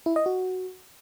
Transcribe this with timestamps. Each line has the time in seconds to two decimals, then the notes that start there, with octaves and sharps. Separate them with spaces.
0.06 E4
0.16 D#5
0.26 F#4